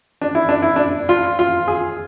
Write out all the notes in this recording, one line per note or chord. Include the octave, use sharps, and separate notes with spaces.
D4
E4
D4
E4
D4
F4
F4
G#4